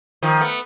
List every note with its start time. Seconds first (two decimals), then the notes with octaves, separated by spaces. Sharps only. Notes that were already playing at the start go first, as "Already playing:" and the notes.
0.23 D#3 F3
0.41 A3 B3